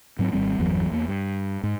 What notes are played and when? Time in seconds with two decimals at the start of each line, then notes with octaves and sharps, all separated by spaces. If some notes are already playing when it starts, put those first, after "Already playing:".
0.19 G#2 F#3 C4
0.33 G#1 G2 G3 C4
0.59 G1 E2 E3 F#3
0.91 E2 A#3
1.08 G2
1.63 G#2